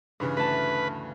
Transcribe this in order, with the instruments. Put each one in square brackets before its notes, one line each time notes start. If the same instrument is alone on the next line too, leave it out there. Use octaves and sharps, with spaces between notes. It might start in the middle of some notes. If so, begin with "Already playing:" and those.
[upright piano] G2 C#3 E3 [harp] B4
[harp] D2 A5 [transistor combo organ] B4